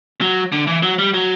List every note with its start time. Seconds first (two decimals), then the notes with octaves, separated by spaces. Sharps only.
0.21 F#3
0.52 D3
0.67 E3
0.83 F#3
0.98 G3
1.14 F#3